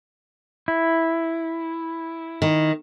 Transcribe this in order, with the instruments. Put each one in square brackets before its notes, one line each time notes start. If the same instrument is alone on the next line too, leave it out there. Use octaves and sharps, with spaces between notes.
[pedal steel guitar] E4
[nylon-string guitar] D#3